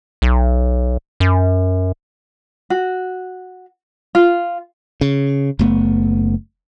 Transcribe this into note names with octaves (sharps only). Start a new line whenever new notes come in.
B1
F#2
F#4
F4
C#3
F#1 A3 B3